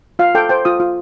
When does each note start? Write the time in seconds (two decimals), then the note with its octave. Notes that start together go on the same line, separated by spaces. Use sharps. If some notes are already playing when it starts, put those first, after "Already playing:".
0.19 F4 F5
0.35 A4 G5
0.49 C5 G5
0.65 F4 D#6
0.80 F4